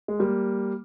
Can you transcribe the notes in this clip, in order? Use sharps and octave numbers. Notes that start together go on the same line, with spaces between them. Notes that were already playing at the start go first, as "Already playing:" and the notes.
G#3
G3 A#3